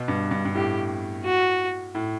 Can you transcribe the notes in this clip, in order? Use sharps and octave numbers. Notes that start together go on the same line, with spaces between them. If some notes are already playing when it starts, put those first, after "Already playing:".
Already playing: B2
G2
G2
G2
A2 G4
F#4
A2